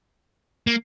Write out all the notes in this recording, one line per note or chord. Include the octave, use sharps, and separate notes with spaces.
A#3